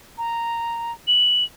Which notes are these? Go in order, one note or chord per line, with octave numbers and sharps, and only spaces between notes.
A#5
F#7